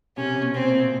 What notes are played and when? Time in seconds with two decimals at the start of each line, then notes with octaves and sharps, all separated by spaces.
0.16 C3 C#4
0.41 B2
0.54 C4
0.65 A#2